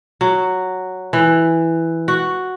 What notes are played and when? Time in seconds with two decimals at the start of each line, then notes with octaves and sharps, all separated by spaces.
0.21 F#3
1.13 E3
2.08 F#4